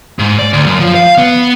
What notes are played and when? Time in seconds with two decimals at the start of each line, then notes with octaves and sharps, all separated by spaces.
0.19 G#2
0.39 D5
0.53 D2
0.67 F#2
0.80 F3
0.95 F5
1.18 B3